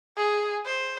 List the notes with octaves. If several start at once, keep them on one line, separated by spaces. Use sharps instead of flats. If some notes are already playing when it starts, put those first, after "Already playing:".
G#4
C5